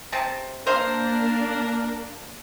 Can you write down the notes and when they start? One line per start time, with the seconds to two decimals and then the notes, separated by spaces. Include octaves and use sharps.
0.12 C3 A5
0.67 A#3 D4 A#4 C5 F5